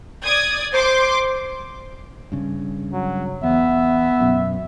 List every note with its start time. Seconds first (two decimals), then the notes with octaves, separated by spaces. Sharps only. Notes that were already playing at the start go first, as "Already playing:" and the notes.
0.23 D5 D#6 G#6
0.74 C5 C6 D6
2.32 G2 C#3
2.93 F#3
3.43 E2 B3 E5
4.20 F#2 B2